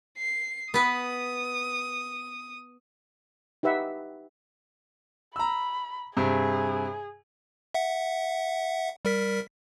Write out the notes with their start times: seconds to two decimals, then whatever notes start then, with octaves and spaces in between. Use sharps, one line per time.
0.18 C7
0.74 B3 B4 D#6
3.63 D#4 G4 B4 E5 F#5
5.36 A#5 B5 E6
6.17 G2 C3 G#4
7.74 E5 F#5
9.05 G3 A#4 B6